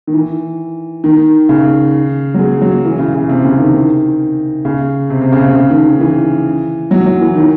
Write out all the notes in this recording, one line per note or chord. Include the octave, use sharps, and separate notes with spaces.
D#3
E3
D#3
C#3
F#3
G#3
F#3
E3
C#3
C#3
C3
C#3
D#3
C#3
C3
C3
C#3
C3
C#3
D#3
D#3
E3
F#3
F#3
E3
D#3